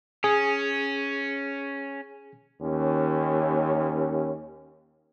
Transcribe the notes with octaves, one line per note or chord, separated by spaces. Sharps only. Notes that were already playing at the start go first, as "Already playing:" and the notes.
C#4 G#4
D#2 C#4